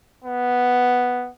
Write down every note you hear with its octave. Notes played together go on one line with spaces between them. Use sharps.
B3